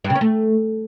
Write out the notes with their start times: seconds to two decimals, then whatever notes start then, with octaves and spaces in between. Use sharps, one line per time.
0.04 G2
0.10 C#3
0.15 C#4
0.21 A3